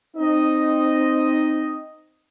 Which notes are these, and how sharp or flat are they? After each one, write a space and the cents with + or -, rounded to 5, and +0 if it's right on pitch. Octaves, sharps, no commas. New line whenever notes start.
C4 +0 D#4 -10 D#5 +0